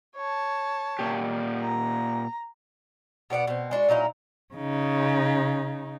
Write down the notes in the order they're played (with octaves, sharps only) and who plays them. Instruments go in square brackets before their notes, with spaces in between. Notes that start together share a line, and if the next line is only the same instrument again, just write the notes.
[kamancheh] C#5 A5
[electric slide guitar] A#2 G4
[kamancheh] A#5
[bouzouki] B2 B3 D5 F#5
B2 C4
G#3 D4 E4 F#4
A#2 F#3 D#4 E4
[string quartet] C#3 D#4